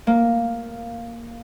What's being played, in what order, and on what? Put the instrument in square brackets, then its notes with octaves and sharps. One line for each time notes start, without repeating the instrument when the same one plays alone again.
[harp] A#3